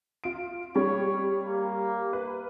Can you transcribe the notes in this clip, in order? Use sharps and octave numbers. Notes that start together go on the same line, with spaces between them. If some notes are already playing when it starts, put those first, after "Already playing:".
F4 D7
G3 C#5
A#3
B4